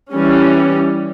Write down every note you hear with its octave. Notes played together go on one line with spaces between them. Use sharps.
E3 G3 C#4